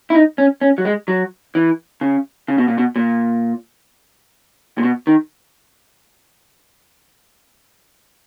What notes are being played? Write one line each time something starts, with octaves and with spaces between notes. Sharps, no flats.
E4
D#4
C#4
C#4
F#3
G#3
F#3
E3
C#3
C#3
B2
A#2
B2
A#2
A#2
B2
D#3